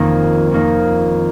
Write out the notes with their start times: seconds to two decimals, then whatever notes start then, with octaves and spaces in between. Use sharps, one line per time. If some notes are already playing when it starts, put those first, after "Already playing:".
Already playing: F2 D#3 A#3 D#4
0.51 F2 D#3 A#3 D#4